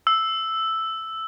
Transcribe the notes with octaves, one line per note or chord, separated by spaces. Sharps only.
E6